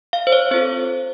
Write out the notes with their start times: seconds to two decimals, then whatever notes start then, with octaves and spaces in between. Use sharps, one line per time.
0.13 F5
0.27 C5
0.32 C#5
0.51 C4 F4 A4 C5